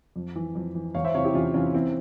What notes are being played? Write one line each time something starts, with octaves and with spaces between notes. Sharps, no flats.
F2
E3
F2
E3
E2 C#5 F5
C5 E5
C3 E3 C#5 F5
E4 G4
E2 C#4 F4
C3 E3 C#4 F4
E2 C4 E4